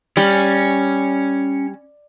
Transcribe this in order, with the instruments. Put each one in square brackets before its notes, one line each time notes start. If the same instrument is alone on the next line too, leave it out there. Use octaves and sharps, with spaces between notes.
[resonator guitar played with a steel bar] G3 [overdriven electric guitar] C#4